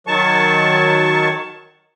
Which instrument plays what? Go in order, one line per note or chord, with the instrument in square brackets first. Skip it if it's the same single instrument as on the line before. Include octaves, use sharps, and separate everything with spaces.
[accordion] D#3 F#3 A5 C#6